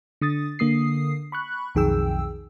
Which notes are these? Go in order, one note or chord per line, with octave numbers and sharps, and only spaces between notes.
D3 D#6 A6
D3 A#3 D#6 C7
B5 C#6 F#6
B1 F2 D#3 G#4 G5 E6